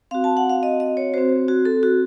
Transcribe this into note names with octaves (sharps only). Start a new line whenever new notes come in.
C4 F#4 F5
A5
F#5
F5
D#5
D#5
C#5
C4 F#4 C5
F#4
A4
F#4